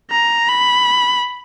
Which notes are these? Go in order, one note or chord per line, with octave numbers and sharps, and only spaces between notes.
A#5
B5